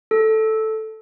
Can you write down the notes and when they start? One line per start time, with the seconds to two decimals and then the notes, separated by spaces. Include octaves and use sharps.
0.11 A4